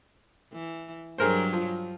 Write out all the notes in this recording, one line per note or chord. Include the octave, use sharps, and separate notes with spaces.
E3
G2 F#3 G#4 A#4 C5
F3